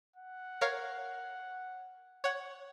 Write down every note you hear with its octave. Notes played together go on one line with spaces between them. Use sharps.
F#5
A#4 C#5 F5
C#5 F#5